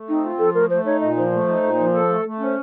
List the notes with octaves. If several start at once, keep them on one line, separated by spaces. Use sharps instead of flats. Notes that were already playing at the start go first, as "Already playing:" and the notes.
Already playing: A3
C4 D#4
F4
F3 A4
A3 A#4
A3 C5
D#4 C#5
A#2 D#5
F3 C5
A3
D#4
A#2
F3
A4
A3
A3
C#4 C5